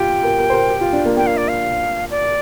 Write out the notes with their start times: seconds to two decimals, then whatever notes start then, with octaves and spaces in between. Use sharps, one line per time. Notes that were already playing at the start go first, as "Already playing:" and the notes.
Already playing: F4 G4 G5
0.23 A#4
0.38 A#4
0.50 C5
0.54 A#4
0.70 G4
0.81 F4
0.93 D4
1.05 A#3
1.17 A#3 G5
1.27 F5
1.37 D5
1.48 F5
2.11 D5